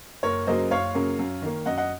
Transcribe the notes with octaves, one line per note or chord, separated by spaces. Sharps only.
F#1 A#4 C#5
F#2 C#3 F#3 A#3 C5 D#5
F#1 C#5 F5
F#2 C#3 F#3 A#3
F#2
D#3 A#3
F#2 D#5 F#5
D#5 F#5